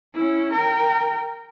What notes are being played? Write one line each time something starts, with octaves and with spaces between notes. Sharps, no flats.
C#4 E4
A#4 G5